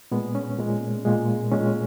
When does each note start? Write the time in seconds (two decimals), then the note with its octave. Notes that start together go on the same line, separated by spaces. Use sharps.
0.11 A#2 G#3 B3
0.35 C#4
0.58 A#2 G#3
1.05 A#2 G#3
1.52 A#2 G#3 C#4